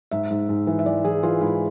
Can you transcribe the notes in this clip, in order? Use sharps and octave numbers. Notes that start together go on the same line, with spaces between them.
G#2 E5
G#2
G#2
E3
E5
E3 D5
E3 G#4
E3 F4
G#2 E4